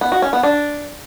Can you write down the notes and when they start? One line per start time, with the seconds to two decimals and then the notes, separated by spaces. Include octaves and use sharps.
0.01 B3
0.12 F#4
0.22 C#4
0.33 B3
0.43 D4